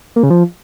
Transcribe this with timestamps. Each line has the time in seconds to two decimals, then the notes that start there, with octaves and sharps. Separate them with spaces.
0.16 A#3
0.23 C#3
0.30 F3